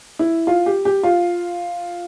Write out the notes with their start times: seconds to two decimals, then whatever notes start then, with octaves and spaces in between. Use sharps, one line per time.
0.19 E4
0.47 F4
0.66 G4
0.85 G4
1.03 F4